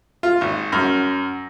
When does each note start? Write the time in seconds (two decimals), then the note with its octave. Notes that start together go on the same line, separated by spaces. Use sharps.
0.23 F4
0.41 G#1
0.72 F#2